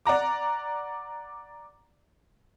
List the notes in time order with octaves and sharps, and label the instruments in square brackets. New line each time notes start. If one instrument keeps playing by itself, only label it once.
[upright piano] D5 F#5 A#5 D6